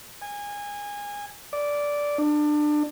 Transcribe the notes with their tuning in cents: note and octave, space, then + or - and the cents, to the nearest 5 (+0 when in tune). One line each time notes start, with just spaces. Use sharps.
G#5 -25
D5 -10
D4 +25